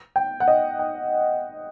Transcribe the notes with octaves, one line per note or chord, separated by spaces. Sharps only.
G5
F#5
D#5
G5